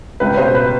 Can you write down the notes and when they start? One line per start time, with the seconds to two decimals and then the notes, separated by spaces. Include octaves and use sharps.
0.20 C#2 B4
0.34 B4
0.37 B2 C5
0.55 B4